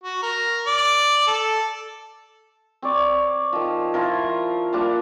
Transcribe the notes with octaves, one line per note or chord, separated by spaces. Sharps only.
F#4
A#4
D5
A4
C4 C#5 D5
D#3 F3
F3 E4 F4 A#4
F3 G3 A#3 D4